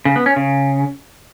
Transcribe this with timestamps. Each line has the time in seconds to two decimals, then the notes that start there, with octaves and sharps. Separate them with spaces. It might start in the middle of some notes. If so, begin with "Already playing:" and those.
0.05 C#3
0.16 B3
0.26 C#4
0.36 C#3